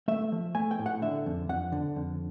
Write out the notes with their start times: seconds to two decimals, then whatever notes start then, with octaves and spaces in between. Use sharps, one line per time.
0.08 A3 E5
0.32 F3
0.55 A3 G#5
0.71 G5
0.79 A2
0.86 F#5
1.02 D3 E5
1.26 F2
1.49 F2 F#5
1.72 D3
1.96 F2